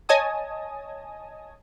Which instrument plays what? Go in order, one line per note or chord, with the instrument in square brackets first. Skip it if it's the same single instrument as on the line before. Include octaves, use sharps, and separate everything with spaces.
[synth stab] C#5 D#5 G#5 A5 D#6